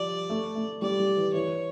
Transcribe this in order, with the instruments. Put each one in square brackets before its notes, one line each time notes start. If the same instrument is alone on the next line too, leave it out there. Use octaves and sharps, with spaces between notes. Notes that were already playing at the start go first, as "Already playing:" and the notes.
Already playing: [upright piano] F3 G3 [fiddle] D5
[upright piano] A3
A3
[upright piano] G3 [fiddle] D5
[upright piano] G3
E3
[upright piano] E3 [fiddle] C#5